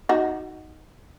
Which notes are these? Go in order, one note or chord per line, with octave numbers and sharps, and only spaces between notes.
D#4 F#4